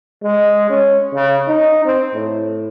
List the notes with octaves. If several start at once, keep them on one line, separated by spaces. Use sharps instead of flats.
G#3
C#4
C#3
D#4
C4
A2